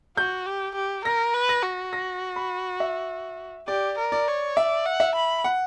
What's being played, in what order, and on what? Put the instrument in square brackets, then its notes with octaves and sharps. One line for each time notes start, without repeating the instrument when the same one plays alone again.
[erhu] F#4 [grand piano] G6
[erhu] G4
G4
[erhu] A#4 [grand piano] A#6
[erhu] B4
[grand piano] A#6
[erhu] F#4
[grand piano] A#6
B5
E5
[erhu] G4 [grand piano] D5
[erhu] A#4
[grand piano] D5
[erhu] C#5
[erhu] D5 [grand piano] E5
[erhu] F#5
[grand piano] E5
[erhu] B5
[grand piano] F#5